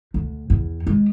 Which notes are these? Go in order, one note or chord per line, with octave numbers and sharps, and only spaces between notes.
D2
E2
G#3